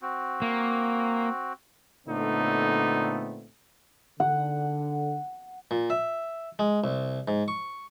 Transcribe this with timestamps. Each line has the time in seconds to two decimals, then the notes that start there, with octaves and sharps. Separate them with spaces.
0.02 C4 F#4
0.42 A#3
2.07 A#2 D3 A3 B3 C4 D#4
4.20 D3 F#5
5.71 A#2
5.90 E5
6.59 G#3
6.84 C2
7.28 G#2
7.48 C#6